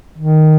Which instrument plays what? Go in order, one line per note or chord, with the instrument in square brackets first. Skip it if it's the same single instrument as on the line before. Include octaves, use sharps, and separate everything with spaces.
[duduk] D#3